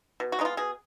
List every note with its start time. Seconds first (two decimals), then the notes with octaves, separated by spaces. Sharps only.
0.20 B2
0.32 F#4
0.39 G#3 B3 D#4
0.45 F4
0.57 B2 G#4